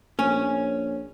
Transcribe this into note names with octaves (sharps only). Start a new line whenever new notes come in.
A#1 C#4